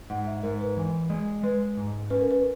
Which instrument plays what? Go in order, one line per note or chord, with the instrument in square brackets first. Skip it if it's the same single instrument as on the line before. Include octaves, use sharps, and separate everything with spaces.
[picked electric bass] G#2 [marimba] F#5
[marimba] E5
[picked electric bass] G#2 [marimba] A#4
[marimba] B4
[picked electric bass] E3
G#3
[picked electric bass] G#3 [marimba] B4
[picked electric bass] G#2
[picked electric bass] C#4 [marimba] B4
[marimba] A#4
B4